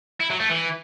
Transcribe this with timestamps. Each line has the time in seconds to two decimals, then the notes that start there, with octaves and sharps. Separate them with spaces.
0.20 E4
0.31 F#3
0.41 A3
0.51 E3